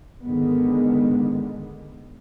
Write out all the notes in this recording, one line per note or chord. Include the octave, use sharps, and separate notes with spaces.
G#2 D3 D#3 G#3 B3